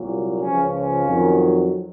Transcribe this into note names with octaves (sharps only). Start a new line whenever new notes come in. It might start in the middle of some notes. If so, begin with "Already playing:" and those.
Already playing: C2 A#2 F#3
C#2 C#3 F3 C#4
C#4
F2 D#3 F#3